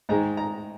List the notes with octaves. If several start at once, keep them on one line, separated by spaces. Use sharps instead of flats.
G#2 D#3 G#3 A#5
A#5